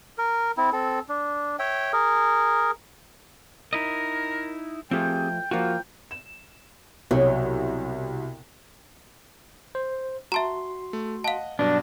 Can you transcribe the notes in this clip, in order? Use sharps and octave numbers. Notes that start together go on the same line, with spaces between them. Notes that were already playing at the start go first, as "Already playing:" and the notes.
A#4
C4 E4
C4 A4
D4
C#5 E5 G5
G#4 A#4
D#4 E4 A#4 D#5
F3 A3 C4 G4 G#4 G5
F3 A#3 F4 F#4 G5
E7
C2 B2 F#3
C5
F#4 E5 A5 A#5 C6
A3
D#5 F5 F#5 A5
G2 B2 F#3 D4